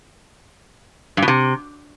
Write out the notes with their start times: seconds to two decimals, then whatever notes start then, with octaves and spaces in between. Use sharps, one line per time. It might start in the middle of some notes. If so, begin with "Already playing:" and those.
1.17 G2
1.22 B2
1.28 C3